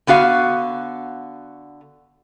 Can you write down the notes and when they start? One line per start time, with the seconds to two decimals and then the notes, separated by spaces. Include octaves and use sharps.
0.07 D3 B3 F#4 F5